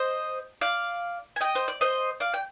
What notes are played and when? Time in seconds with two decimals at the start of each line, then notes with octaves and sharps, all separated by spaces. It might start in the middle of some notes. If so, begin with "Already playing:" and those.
Already playing: C5 D#5
0.61 D5 F5
1.36 G#5
1.41 D#5 G5
1.55 C5
1.68 D5
1.81 C5 D#5
2.20 D5 F5
2.34 G5